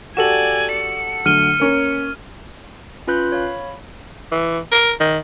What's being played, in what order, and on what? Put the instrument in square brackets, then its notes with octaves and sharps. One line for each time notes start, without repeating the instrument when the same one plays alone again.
[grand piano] F#4 G4 A4 [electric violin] D5 G#5 [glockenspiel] E7 F#7
[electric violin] C#7
[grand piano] D3 F#3 A3 [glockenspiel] F6 D#7 G7
[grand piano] A#3 C#4 A#4
[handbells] C#4 F4 B4 B5 F#6 G6
C#5 F5 B5
[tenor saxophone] E3
A#4
D#3